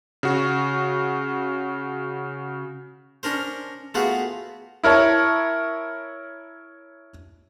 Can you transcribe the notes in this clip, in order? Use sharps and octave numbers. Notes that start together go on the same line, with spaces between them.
C#3 F#4
C#4 D4 A#4 C5
A3 B3 F4 F#4 G#4
E4 A#4 C#5 A5